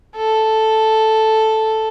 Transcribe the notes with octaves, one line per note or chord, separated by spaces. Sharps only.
A4